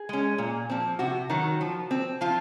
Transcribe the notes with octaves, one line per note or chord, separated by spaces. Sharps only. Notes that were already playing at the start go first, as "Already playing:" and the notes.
Already playing: G#4
G#3 C#4
A#2
F3 C4
C3 F#4
D#3 F#3
F3
C4
F3 F4